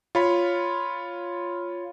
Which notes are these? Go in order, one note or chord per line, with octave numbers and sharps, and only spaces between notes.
F4 C#5 B5